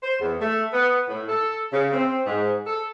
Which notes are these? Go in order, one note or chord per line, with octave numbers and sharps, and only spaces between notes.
C5
E2
A3
B3
A2
A4
C#3
C4
G#2
A4